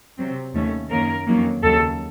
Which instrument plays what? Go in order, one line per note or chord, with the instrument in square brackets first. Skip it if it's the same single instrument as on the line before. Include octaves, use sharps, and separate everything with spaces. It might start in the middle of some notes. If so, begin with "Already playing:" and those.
[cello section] C3 F#3 C4
D#2 D#3 A3 C#4
F#2 D#3 A#3 C#4 A#4
F2 D#3 F#3 A#3 C#4
D#2 C#3 F#3 A4